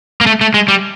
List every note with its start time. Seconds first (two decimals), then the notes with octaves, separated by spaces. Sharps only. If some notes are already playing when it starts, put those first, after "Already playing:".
0.21 A#3
0.26 A3
0.41 A3
0.54 G#3
0.68 G3